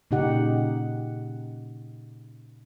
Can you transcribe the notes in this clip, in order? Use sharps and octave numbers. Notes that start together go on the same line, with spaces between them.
A#2 C#3 D#4 G4 F#5